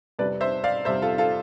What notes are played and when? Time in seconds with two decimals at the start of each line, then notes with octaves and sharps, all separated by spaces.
0.19 F2 C3 G3 B4 D5
0.41 C5 E5
0.64 D5 F5
0.85 F2 C3 G3 C5 E5
1.02 F4 A4
1.18 F4 A4